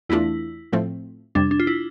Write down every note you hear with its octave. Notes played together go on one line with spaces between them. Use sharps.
E2 E3 A3 D4 E4 F4
A2 F3 A3 C4
F2 C3 G3 D4
D4
F4
E4